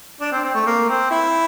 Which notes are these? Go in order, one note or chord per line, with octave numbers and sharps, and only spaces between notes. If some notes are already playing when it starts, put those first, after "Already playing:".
D4
C4
C4
A3
A#3
C4
E4